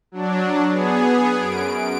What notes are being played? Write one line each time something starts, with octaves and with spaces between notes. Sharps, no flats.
F#3 D4
B3 G#4
F#2 D7